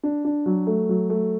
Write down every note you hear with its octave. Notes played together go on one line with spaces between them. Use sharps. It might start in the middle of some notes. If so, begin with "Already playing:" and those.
D4
D4
F#3
A3
F#3
A3